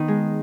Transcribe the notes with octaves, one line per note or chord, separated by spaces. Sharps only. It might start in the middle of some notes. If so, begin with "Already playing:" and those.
Already playing: D#3 B3
G#3